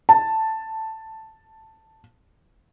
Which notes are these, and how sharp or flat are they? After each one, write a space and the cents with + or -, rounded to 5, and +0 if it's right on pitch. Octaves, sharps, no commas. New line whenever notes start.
A5 +5